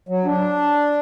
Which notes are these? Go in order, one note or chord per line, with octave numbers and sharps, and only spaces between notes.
F#3
D4